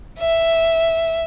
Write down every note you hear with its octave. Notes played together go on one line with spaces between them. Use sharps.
E5